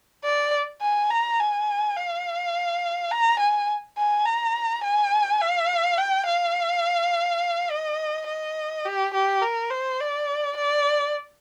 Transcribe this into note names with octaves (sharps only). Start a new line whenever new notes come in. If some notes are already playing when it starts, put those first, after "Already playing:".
D5
G#5
A#5
G#5
F5
A#5
G#5
G#5
A#5
G#5
F5
G5
F5
D#5
D#5
G4
G4
A#4
C5
D5
D5